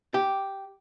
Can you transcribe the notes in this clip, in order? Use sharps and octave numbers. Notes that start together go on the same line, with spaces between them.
G4